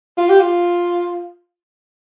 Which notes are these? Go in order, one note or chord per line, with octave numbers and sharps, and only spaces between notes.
F4
G4
F4